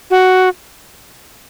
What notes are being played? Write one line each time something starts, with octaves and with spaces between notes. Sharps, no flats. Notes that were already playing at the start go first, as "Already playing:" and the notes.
F#4